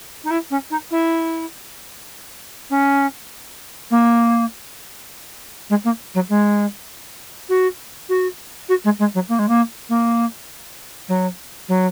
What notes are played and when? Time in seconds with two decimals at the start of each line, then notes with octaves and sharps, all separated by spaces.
0.24 D#4
0.30 E4
0.50 C#4
0.70 D#4
0.91 E4
2.70 C#4
3.90 A#3
5.69 G#3
5.84 A#3
6.14 F#3
6.29 G#3
7.49 F#4
8.09 F#4
8.69 F#4
8.84 G#3
8.99 G#3
9.14 F#3
9.29 A#3
9.39 G#3
9.48 A#3
9.89 A#3
11.08 F#3
11.68 F#3